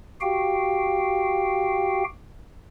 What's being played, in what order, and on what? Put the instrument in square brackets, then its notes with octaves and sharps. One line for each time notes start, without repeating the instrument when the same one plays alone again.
[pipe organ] F#4 G4 F5 G5